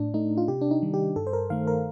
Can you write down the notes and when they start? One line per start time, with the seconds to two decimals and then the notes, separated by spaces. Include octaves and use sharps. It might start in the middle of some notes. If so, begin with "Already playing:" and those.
Already playing: A2 D4
0.14 A3 D#4
0.37 F4
0.48 C3 G4
0.61 D4
0.71 D#4
0.82 D#3 G3
0.94 G4
1.16 G2 A4
1.27 C5
1.33 A#4
1.50 D#3 A3 F5
1.67 A#4